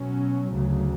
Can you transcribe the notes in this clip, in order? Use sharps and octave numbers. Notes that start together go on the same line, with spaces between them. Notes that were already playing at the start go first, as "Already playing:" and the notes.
Already playing: B2 F#3 C#4
D2 C#3 F#3